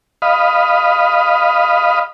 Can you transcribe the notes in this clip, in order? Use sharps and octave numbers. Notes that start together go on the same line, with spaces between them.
D#5 F5 B5